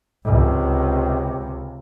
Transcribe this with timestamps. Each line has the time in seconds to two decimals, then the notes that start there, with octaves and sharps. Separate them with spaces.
0.24 C#2 C3